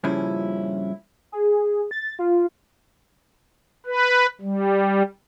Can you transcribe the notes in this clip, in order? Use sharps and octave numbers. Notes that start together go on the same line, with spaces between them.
G2 A#2 C#3 F3 C#4 E4
G#4
A6
F4
B4
G3